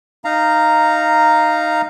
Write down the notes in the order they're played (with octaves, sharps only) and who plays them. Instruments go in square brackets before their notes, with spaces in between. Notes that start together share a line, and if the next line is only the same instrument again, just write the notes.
[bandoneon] D#4 F5 A#5